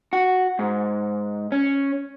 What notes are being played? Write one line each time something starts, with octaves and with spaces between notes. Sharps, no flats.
F#4
G#2
C#4